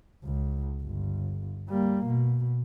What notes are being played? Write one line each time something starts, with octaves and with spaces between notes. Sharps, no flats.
C#2
G1
G3 A#3
B2